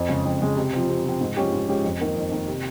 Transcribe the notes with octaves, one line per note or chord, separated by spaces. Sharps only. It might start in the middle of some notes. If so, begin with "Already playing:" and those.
Already playing: F2
C#3 G#3
F2
C#3 G#3
C3
F3 C4
C3
F3 C4
G#2
F3 G#3 C#4 G4
G#2
F3 G#3 C#4 G4
F2
D#3 A#3
F2
D#3 A#3
C3